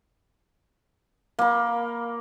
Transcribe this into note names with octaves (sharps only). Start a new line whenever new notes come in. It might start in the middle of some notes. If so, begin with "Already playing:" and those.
A#3 B5